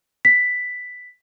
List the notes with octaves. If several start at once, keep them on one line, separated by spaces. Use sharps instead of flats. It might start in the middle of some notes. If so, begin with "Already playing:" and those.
B6